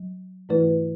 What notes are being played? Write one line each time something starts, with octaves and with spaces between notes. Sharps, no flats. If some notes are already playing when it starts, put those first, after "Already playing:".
Already playing: F#3
G#2 E3 A3 E4 B4